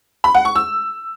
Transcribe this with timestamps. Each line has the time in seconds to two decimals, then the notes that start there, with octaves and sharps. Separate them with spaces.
0.24 B5
0.34 F#5
0.45 C#6
0.55 E6